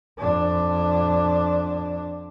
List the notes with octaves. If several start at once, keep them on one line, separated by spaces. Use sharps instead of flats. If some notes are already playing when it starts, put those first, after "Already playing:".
F2 D4